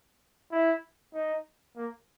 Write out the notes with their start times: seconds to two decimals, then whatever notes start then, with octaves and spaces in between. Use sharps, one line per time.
0.52 E4
1.14 D#4
1.76 A#3